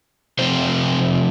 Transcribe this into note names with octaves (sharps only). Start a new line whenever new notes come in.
C3 F3 A3 C4 C5